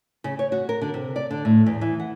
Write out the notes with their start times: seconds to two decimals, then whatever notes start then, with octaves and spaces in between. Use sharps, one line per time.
0.24 C#3
0.39 C#5
0.52 F#4
0.69 A#4
0.82 D3
0.94 C3
1.16 D5
1.31 D3
1.45 A2
1.66 E2
1.81 E3
2.00 F#5